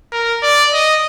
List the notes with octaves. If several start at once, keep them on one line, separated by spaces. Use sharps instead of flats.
A#4
D5
D#5